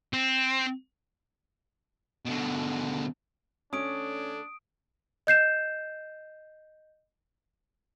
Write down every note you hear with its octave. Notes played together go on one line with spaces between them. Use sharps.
C4
B2 D3
D3 A3 C#4 D4 D#6 D7
D#5 G6 C7 E7